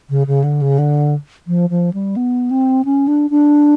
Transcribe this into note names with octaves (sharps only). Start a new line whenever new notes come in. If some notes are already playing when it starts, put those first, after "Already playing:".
C#3
C#3
D3
C#3
D3
F3
F3
G3
B3
C4
C#4
D4
D4